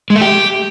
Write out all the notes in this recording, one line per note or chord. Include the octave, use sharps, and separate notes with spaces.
G#3
A3
G4